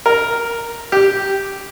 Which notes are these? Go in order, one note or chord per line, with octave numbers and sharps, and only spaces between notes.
A#4
G4